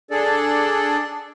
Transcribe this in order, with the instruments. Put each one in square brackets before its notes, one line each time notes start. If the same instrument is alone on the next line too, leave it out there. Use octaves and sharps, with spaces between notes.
[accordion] D4 G#4 A4 D5